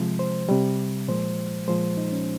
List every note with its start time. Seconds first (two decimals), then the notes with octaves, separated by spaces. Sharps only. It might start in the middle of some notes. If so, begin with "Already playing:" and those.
Already playing: C3 F3 G#3
0.19 C5
0.49 C3 G3
1.08 A#2 F3 G#3 C5
1.68 A#2 F3 G#3 C5
1.97 D#4
2.12 C#4